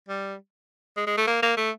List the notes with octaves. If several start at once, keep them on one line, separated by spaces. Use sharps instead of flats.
G3
G#3
G#3
A3
A#3
A#3
A3